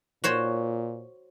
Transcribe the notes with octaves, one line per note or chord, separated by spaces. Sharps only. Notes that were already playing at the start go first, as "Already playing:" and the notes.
A#2 F#4 C5 C#5